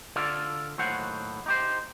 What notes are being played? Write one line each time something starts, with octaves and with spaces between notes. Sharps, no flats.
D3 F4 A4 D5 F5
D#2 A2 F#3 C5 F#5
D#4 G4 C5